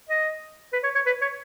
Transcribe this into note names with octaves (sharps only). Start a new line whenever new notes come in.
D#5
B4
C#5
C#5
B4
C#5